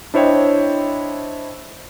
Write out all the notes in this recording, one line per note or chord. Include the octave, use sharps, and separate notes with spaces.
D4 E4 C5 C#5 D#5 G5